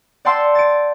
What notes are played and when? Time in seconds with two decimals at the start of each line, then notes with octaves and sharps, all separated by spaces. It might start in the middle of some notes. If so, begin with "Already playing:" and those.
0.25 D5 F#5 G5 A5 C6 E6
0.55 A6 D7